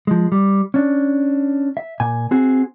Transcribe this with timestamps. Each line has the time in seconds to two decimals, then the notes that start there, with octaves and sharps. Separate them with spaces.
0.07 F3 G#3
0.32 G3
0.74 C#4 D4
1.77 E5
2.00 A#2 G#5
2.31 C4 F#4 G#4